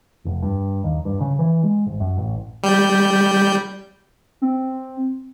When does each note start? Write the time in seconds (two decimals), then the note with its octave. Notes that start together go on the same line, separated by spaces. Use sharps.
0.25 F1
0.42 G2
0.84 D#2
1.05 G2
1.21 C#3
1.39 E3
1.64 G#3
1.86 G#1
2.00 F#2
2.18 A1
2.63 G3 G6
4.42 C4